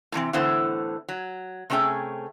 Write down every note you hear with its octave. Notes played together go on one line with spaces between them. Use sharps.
A2 C3 E3 C4
A2 D3 E3 B3 C5
F#3
C3 A3 C#4 G#4 G5